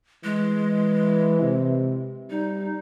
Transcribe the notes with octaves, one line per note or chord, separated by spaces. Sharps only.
E3 G#3
C3
G3 D#4